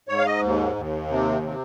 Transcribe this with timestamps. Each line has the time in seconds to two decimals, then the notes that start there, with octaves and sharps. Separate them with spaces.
0.09 G#2 C#5
0.18 F5
0.26 D#5
0.42 D#2
0.76 D#2
1.09 C3
1.43 C3